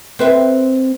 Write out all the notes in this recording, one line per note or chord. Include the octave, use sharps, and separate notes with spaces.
C4 B4 E5